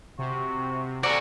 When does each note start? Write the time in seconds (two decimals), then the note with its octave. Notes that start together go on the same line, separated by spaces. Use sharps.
0.19 C3 F#4
1.03 F#4 A4 D5 G#5 A#5 C6